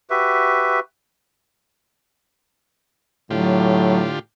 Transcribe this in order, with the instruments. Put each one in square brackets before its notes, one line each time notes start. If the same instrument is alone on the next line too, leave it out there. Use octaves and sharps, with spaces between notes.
[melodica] F#4 G4 B4 E5
[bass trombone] A2 [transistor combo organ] D3 F4 G4 [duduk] F#3